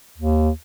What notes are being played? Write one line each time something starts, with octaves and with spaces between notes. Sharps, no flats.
D#2